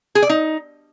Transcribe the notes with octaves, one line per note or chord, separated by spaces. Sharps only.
G#4
D5
D#4